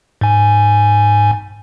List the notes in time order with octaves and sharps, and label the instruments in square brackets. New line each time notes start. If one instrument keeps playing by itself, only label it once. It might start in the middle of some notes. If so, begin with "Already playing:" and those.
[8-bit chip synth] G#2 G#5